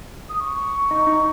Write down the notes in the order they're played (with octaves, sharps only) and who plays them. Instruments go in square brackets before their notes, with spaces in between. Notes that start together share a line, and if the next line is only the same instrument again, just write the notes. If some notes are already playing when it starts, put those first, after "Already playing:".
[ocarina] D#6
C#6
[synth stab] D#4
D#4